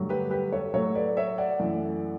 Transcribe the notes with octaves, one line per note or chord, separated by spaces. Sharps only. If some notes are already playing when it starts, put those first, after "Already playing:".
Already playing: G2 D3 F#3 A3
G4 B4
G4 B4
A4 C#5
A2 F#3 A3 A4 C#5
B4 D5
C#5 E5
D5 F#5
F#2 E3 A3